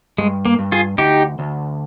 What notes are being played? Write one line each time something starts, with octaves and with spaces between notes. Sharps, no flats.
G2 G#3
A#3
G2
F4 G#4
D2 D#4 G4
D2